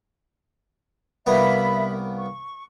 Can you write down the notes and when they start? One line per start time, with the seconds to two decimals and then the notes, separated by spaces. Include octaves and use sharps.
1.26 C2 A#3 B3 E5 B5
2.18 C#6